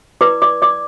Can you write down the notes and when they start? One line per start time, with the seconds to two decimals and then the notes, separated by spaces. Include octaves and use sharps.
0.21 E4 B4 D5 D6
0.42 D5 D6
0.62 D5 D6